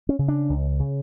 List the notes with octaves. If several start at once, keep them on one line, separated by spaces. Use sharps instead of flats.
C#4
C#3
D4
C#2
C#3